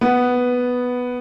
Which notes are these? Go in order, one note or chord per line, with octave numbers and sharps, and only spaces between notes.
B3